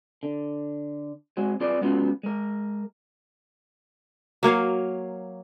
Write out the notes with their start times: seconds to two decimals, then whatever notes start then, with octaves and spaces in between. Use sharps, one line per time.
0.23 D3
1.37 G#3 C4 F#4 G#4
1.60 C4 F4 G#4 B4 D5
1.81 G#3 B3 C#4 F4 F#4
2.23 G#3 A#4
4.43 F#3 A#3 C#5 F5